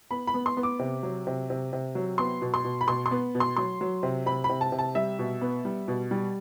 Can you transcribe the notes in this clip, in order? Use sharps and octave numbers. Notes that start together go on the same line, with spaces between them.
B3 B5
B5
B3
C6
B3
D6
C3
F#3
C3
C3
C3
F#3
B3 C6
B2
C6
B2
B5
B2 C6
C6
B3
B2
C6
F#3 C6
F#3
C3
C3 B5
B5
C3
A5
C3
A5
G3 E5
B2
B3
G3
B2
G3